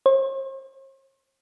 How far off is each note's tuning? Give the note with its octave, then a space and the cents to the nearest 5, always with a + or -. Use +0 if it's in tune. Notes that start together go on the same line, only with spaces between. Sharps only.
C5 +45